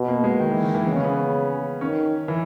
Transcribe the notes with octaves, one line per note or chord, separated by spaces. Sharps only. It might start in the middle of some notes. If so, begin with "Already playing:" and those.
Already playing: B2
A#3
G#3
D#3
E3
D#3
E3
C#3 B3
C#4
B3
D#3 C#4
E3